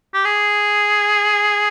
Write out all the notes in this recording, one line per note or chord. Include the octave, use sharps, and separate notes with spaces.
G4
G#4